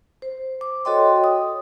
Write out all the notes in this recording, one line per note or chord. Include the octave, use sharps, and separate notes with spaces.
C5
D6
F#4 A4 C#5 D#5 G5 C6
D#6